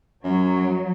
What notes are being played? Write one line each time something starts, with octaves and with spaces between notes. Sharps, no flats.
F#2 F#3